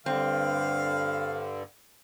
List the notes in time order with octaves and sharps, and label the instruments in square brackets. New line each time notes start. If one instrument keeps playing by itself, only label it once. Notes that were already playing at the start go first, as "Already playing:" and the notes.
[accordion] G2 D3 [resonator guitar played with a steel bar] C4 [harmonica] F5